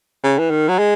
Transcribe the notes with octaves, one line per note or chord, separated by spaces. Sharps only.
C#3
E3
D#3
F#3
G#3